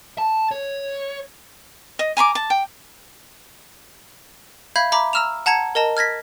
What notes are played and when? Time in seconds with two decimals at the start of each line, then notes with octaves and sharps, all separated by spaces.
0.18 A5
0.51 C#5
1.99 D#5
2.17 G#5 A#5 B5 D6
2.35 A5
2.50 G5
4.76 E5 F5 B5 G6 G#6
4.92 E5 A#5 B5 D6
5.13 A#5 E6 F6 E7 F7
5.46 F#5 A5 A#5 G#6 C#7
5.75 A#4 D#5 A5 A#5
5.97 F6 G#6 A#6 B6